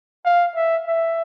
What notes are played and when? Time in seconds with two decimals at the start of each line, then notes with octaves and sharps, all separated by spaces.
0.25 F5
0.55 E5
0.86 E5